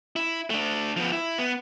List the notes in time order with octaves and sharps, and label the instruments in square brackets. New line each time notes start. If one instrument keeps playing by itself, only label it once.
[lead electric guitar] E4
A3 D4
F3 B3
E4
B3